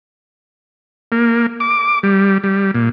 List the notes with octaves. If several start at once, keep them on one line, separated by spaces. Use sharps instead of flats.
A#3
D6
G3
G3
A#2